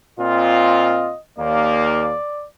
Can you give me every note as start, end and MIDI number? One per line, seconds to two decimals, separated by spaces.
0.19 1.13 46
0.19 1.13 60
0.19 1.13 65
0.19 1.21 75
1.39 2.15 39
1.39 2.15 58
1.39 2.47 74